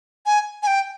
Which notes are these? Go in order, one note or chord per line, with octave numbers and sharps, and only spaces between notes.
G#5
G#5
G5